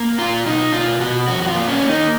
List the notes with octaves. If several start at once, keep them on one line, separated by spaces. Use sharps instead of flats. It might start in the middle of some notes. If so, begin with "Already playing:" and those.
Already playing: A#3
A#2 F4
B2 D#4
B2 F4
B2 F#4
F2 F#4
F#4
F4
A#3
C#4
A#3
D#4